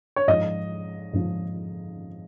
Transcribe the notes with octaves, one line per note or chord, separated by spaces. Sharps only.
C#5
G#2 F3 D#5
G#2 F3